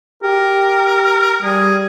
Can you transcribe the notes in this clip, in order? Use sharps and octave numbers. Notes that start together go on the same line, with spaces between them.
G4 A#4
G3 G#4